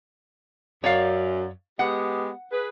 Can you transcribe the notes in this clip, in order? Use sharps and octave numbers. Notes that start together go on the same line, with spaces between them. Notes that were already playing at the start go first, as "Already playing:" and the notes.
F#2 C#5 D5 F5
G#3 B3 G4 F#5
G#4 B4